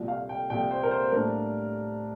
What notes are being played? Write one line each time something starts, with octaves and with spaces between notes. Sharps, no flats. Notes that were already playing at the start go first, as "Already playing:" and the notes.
Already playing: C2 A#2 F3
F5
G5
C2 A#2 F3 G5
C5
A#4
C5
A2 G3 A#3 D4 A#4